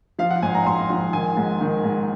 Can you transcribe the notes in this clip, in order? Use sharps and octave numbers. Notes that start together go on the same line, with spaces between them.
F3 F5
F#5
G#1 G#5
A#5
G#1 C6
F3
D#3 G#5
G#2
D#3
G#2